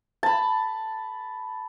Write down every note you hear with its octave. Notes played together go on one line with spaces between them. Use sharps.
A5 B5